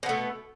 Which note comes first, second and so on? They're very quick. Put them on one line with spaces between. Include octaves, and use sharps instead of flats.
B2 B3 A3